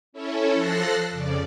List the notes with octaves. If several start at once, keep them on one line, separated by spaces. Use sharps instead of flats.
C#4 E4 A4 C#5
F3 A4 F#6 A6 A#6 C7
F2 C#3 D5